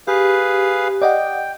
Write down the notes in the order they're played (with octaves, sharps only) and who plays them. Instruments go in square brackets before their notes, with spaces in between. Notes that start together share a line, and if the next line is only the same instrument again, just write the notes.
[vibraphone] G4 [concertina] G#4 B4 F5
[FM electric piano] D5 D#5 F#5 [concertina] G5